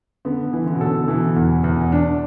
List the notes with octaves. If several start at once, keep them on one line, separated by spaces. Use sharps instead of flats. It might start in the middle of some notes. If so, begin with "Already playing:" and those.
D3 B3
E3
D3
B2
D3 A4
B2 E3
E2
E2
D4